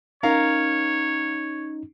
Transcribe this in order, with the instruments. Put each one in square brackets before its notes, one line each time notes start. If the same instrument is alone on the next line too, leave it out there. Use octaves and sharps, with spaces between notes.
[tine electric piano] C#4 D#4 [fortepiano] A#4 F5 A#5 [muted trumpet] C#5